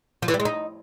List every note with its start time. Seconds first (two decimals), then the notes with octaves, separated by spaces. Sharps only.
0.22 F3
0.28 E3
0.34 G3
0.40 G#3
0.45 D#4